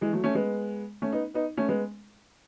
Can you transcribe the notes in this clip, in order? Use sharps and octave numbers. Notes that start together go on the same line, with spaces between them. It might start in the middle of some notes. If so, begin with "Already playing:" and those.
E3 G#3
F#3 A3
A3 C#4
G#3 B3
A3 C#4
B3 D#4
B3 D#4
A3 C#4
G#3 B3